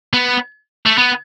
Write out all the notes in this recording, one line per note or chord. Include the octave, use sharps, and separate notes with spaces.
B3
A3
B3